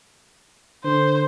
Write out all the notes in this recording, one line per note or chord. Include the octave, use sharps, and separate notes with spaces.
D3 C5